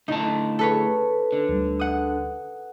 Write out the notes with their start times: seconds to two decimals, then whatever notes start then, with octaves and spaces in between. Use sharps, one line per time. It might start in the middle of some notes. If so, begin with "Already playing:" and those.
0.08 A2 D3 D#4 A5
0.59 A4 B4 C#5
1.32 D3
1.49 D2 G3
1.79 F#5 D#6